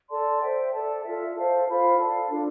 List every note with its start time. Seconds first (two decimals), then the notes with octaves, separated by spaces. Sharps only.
0.10 A4 D5 A5 C6
0.42 C5 E5 G5
0.73 A4 D5 A5
1.05 F4 A4 E5
1.36 A4 C5 F5 A5
1.67 F4 C5 F5 B5
1.98 A4 D5 F5 A5
2.30 D4 F4 A4